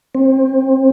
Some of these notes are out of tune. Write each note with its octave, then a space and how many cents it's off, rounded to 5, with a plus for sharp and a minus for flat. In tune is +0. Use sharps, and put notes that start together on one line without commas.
C4 +30